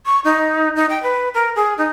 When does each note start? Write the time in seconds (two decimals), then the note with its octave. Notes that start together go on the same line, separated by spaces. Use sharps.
0.06 C#6
0.24 D#4
0.76 D#4
0.89 G5
1.03 B4
1.34 A#4
1.55 G#4
1.78 D#4